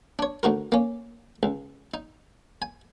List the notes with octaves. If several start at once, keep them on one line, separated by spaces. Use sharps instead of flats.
D4 C#5
D2 D#4 F#4 A#4
A#3 C#4
C#2
D#4
G#5